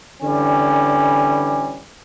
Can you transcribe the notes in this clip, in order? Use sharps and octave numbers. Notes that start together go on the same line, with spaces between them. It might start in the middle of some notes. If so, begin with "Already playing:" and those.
D3 E3 G3 C#4